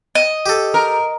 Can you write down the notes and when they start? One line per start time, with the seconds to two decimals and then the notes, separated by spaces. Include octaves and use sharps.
0.15 D#5
0.46 G4 A4
0.74 A#4